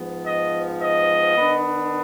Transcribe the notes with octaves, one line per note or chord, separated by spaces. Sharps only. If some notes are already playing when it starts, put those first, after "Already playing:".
Already playing: G#2 F3 B3
D#5
D#5
D#3 B3 D4